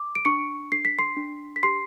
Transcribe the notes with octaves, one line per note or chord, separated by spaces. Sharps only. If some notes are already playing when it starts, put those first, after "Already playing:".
Already playing: D6
D7
D4 C#6 C#7
D4 C7
B6
C6 C7
D4
B6
G4 C6 C7